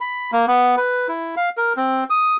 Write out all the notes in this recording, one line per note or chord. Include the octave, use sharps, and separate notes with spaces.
B5
A#3
B3
B4
E4
F5
A#4
C4
D#6